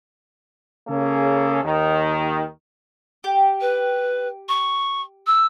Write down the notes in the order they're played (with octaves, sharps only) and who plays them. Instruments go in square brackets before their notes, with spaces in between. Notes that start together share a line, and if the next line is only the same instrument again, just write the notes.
[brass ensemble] C#3 A#3 C#4 G#4 A4
D#2 D#3
[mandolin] G4
[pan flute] B4
C#6
E6